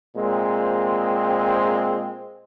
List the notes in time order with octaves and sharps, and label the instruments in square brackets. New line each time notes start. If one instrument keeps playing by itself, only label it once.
[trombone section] A#2 G#3 C4